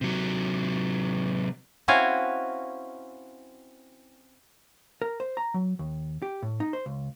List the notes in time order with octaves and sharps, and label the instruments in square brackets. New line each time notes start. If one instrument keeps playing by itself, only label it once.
[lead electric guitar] C3 F#3
[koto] C4 C#4 E4 F#4 F5 G#5
[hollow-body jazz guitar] A#4
C5
A#5
F#3
D#2
G4
A2
D#4
C5
C#2